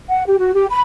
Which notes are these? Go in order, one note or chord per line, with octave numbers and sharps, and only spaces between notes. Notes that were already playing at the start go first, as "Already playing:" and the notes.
F#5
G4
F#4
G4
B5